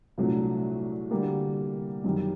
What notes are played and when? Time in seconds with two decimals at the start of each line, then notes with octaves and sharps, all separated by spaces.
0.18 C2 A#2 F#3 A3 D4
1.11 D3 G3 A#3
2.04 F#2 D#3 G3